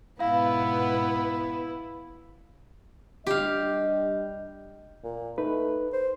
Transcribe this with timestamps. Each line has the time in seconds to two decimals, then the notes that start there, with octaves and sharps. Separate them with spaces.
0.20 G#2 B2 B3 E4 F5
3.27 G3 D4 G4 D#5 F5
5.04 A#2
5.38 A3 D#4 B4
5.93 C5